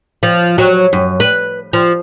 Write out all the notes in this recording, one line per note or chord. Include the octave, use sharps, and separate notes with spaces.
F3
F#3
F#2
B4
F3